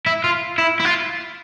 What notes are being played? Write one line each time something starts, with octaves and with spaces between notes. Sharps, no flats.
E4
F4
E4
E4
F4